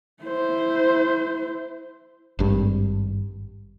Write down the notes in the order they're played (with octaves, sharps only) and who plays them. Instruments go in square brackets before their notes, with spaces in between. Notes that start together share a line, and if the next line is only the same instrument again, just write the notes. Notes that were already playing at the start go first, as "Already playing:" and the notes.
[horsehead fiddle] E4 C5
[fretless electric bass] G#1 G2